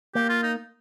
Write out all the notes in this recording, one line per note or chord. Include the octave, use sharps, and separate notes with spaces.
A#3 G4
F4
D#4